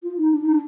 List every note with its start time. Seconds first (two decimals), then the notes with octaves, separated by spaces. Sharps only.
0.03 F4
0.17 D#4
0.31 D4
0.41 D#4
0.51 D4